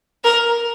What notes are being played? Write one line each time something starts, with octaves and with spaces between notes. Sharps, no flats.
A#4